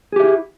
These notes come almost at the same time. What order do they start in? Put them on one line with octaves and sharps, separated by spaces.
G#4 G4 E5 E4